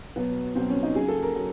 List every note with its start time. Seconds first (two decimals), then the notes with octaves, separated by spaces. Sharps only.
0.16 B2 F#3 B3
0.55 B2 F#3 C4
0.70 C#4
0.83 D#4
0.95 C#3 F#3 G#4
1.08 A4
1.22 A#4
1.35 F#3